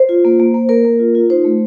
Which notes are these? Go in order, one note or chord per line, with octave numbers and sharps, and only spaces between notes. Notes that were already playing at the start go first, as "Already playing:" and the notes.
Already playing: C5
F4
A#3
A#3
A#3
A#3 A#4
A#3
F4
F4
D#4 C5
A3